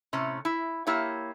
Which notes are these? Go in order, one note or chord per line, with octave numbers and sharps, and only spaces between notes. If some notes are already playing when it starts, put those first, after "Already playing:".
A2 C3 C#4
E4
A#3 E4 G4 C#5